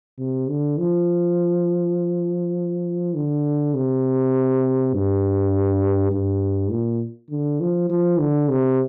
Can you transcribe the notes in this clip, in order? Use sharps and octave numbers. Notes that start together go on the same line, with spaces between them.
C3
D3
F3
D3
C3
G2
G2
A#2
D3
F3
F3
D3
C3